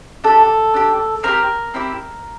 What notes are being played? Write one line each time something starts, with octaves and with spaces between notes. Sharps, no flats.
D4 G4 A4
D4 G4
C4 E4 G4 A#4
C4 E4 G4